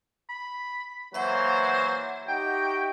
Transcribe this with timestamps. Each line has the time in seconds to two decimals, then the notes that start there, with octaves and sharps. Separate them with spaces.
0.29 B5
1.14 E3 F#3 A#3 C5 E5 F#5
2.28 D#4 F#4 G4 G5